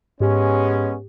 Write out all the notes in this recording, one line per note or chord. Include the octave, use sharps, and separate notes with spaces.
G#2 G#3 B3 C#4 G4